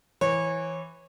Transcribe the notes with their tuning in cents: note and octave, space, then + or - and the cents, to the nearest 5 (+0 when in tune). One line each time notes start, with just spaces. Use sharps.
E3 +0 C#5 -25